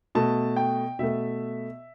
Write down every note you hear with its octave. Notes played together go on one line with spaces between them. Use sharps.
B2 A3 A5
G5
B2 A3 E5